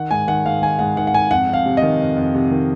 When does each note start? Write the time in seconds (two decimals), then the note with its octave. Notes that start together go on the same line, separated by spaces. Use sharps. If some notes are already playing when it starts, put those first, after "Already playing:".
Already playing: D#3 F#5
0.11 G#2 G#5
0.28 D#3 F#5
0.46 G#2 F5
0.62 D#3 G#5
0.79 G#2 F#5
0.97 D#3 F#5
1.07 F#5
1.14 G#2 G#5
1.31 F2 F#5
1.48 F2 F5
1.66 C3
1.77 D#3 D#5
2.00 F2
2.17 F2
2.35 C3
2.51 D#3